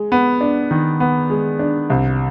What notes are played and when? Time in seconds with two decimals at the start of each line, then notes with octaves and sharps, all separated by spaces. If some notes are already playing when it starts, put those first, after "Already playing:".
Already playing: G#3
0.12 B3
0.41 D4
0.71 D#3
1.00 B3
1.30 G#3
1.59 D4
1.90 C2